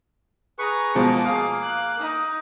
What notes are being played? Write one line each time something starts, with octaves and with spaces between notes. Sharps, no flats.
G#4 B4 A#5 C#6
B2 F3 G#3 A#3 D6
G#4 F5
F#6
D#4